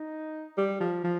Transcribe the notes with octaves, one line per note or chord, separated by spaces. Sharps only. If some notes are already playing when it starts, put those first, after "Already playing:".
Already playing: D#4
G3
F3
F3